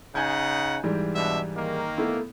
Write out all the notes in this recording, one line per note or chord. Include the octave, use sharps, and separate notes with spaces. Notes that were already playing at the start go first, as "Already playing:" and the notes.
C#3 D#4 F#5 G#5 G6 G#6
G#2 E3 G3
B2 D4 E5
D#3 A#3
A3 B3 E4